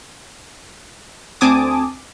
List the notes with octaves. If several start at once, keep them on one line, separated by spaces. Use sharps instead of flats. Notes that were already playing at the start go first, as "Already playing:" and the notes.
D2 C4 G#5 A5 D6 D#6